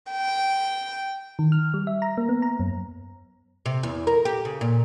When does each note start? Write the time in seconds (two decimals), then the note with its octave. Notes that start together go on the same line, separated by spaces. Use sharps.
0.12 G5
1.39 D#3
1.52 F6
1.74 G3
1.87 E5
2.02 A#5
2.18 A#3
2.29 B3
2.42 A#5
2.60 F#2
3.66 C3
3.83 E2
4.07 A#4
4.25 G4
4.45 C#3
4.61 A#2